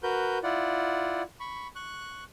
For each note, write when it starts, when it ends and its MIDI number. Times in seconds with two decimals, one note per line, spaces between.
0.03 0.38 66
0.03 0.38 70
0.03 0.38 71
0.03 0.38 91
0.43 1.22 64
0.43 1.22 65
0.43 1.22 74
0.43 1.22 78
1.40 1.68 83
1.40 1.68 85
1.76 2.24 85
1.76 2.24 90